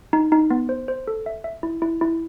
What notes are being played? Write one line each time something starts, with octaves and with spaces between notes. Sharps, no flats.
D#4
D#4
B3
C5
C5
A4
E5
E5
E4
E4
E4